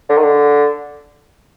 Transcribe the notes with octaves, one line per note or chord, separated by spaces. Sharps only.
D3
D#3
D3